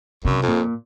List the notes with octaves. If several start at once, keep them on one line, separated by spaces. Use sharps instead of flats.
F#2 C3
F2
A#2